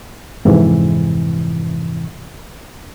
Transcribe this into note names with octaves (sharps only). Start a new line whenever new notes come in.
F2 G#2 C3 E3